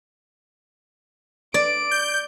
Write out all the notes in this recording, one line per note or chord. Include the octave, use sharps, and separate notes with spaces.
D5 D7
G6